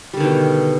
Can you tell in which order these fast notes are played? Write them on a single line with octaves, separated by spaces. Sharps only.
G3 D3 D#3 B2